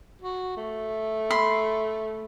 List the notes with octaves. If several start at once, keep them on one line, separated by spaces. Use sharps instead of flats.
F#4
A3
B5 C6